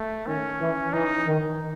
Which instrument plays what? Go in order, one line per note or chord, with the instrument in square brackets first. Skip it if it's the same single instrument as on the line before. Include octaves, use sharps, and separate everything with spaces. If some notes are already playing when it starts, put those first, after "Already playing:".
Already playing: [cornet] A3
[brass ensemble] D#3 [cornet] C#4
[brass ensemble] E3
[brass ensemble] E3 [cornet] D#4
[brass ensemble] D#3